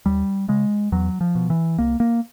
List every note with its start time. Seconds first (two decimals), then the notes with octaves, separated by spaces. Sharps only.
0.06 D#2 G3
0.48 C#3 G#3
0.92 E2 F#3
1.21 F3
1.35 B2
1.50 E3
1.79 C2 A#3
2.00 A#3